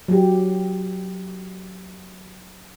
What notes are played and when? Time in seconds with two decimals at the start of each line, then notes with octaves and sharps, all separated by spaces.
0.08 F#3 G4